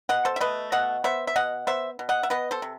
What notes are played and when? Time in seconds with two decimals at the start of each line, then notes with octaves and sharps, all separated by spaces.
0.09 B2 D#5 F#5
0.25 A4 C5
0.36 E5
0.41 A3 B4 D#5
0.72 B2 D#5 F#5
1.04 B3 C5 E5
1.27 E5
1.36 B2 D#5 F#5
1.67 B3 C5 E5
1.99 B2
2.09 D#5 F#5
2.23 E5
2.30 B3 B4 D#5
2.51 A4 C5
2.62 C3